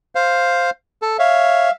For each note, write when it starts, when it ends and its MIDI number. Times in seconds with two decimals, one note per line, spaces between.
0.15 0.70 72
0.15 0.70 77
1.02 1.17 69
1.19 1.69 73
1.19 1.71 76
1.19 1.71 77